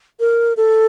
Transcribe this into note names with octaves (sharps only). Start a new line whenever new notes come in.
A#4
A4